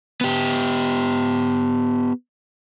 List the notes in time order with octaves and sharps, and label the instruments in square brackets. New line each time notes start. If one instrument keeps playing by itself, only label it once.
[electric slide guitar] B3 G4